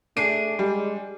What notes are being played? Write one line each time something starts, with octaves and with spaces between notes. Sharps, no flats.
A3 D4 G#4 C7 D7 D#7
G3 G#3